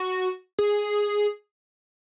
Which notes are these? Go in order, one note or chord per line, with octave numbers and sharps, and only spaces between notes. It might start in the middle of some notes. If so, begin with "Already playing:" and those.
Already playing: F#4
G#4